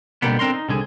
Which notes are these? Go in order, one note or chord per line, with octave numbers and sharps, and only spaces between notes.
B2 D3 D#3 G3 A#3 B3
D3 C4 D4 A#4 C6
D#4
C2 D3 G#4